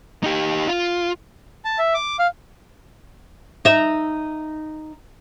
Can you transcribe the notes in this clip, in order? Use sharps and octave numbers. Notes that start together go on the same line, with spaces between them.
D#4 G4
F4
A5
E5
D6
F5
D#4 E5